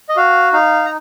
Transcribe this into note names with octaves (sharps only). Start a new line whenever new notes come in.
D#5
F#4 F5
D#4 F5
A#5